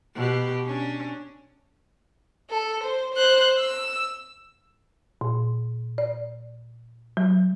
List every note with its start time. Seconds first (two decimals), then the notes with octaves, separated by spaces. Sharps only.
0.15 B2 G4
0.66 C#4 D4
2.50 A4
2.83 C5
3.14 C5 F#6
3.58 E6
5.21 A#2
5.98 D5
7.17 F#3